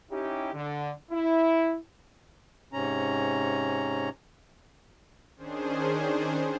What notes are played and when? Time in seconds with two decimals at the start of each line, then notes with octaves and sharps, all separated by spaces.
0.11 C#4 D#4 E4 G4
0.54 D3
1.11 E4
2.73 G#2 C3 C#4 A#5
5.37 D#3 C#4 D4 G#4 C5